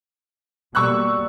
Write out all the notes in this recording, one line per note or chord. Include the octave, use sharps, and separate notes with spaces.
B2 G3 A#3 C#6 E6 F#6